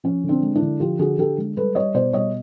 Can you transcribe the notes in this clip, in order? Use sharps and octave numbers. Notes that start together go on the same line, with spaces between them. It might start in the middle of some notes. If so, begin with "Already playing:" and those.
F3 C#4
D3
C4 D4
G#3
D4 E4
D3
F3 F4 G4
D3 F#4 G#4
D3 G4 A4
G#3
G3 A4 B4
G3 C#5 D#5
B2 C5 D5
G3 C#5 D#5